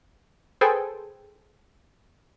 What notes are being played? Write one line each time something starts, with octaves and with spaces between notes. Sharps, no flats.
G#4 A4 B4 C5 G5 G#5